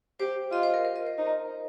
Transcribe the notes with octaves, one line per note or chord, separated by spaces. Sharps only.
G4 C5
F4 D#5
C5
A#4
A#4
D#5
C5
D#4